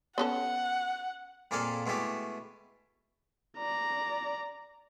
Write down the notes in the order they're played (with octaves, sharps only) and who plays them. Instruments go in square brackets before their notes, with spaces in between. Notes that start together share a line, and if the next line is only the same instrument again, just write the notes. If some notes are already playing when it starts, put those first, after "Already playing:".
[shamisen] B3 C#4 A4 [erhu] F#5
[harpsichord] F2 A#2 A#3 G#4 A4 F5
B2 G#3 A3 E4 G4
[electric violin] D5 A#5